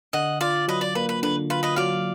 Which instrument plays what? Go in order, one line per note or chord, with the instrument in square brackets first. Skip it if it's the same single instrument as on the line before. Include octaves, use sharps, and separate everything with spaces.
[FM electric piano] D3 [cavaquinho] D#5 F#5
[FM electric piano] F4 [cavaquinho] D5 F5
[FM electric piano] F#3 [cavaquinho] B4 D#5
[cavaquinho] D5
[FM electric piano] A#3 [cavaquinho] B4
[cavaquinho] B4
[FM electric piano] D3 [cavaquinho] B4
[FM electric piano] F4 [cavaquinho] B4
[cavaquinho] B4 D#5
[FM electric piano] F#3 [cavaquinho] D5 F5